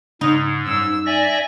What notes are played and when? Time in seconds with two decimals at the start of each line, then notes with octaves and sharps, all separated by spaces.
0.21 G#2 C#3 D#4
0.66 F#2 G3 C#4 E6
1.06 D5 E5 G#5 A#6